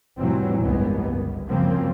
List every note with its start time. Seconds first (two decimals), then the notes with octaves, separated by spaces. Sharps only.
0.17 F1 A2 E3 F#3 G3 C4
0.62 G1 C#2 G2 G#3 A#3 B3
1.10 G1
1.47 F#2 C#3 F3 A#3 C4